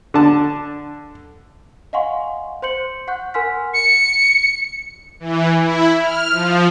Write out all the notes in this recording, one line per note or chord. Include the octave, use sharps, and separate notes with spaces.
D3 A5
D#5 F5 F#5 G#5 C6 C#6
C5 C6 G6 C#7 F#7
F#5 C#6 F#6 G6
A#4 F#5 G#5 C6 F6 B6
C#7
E3
E4
F6
F3